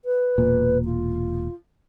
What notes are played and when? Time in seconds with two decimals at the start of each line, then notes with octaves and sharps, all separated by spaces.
0.05 B4
0.38 E1 A#2
0.85 F4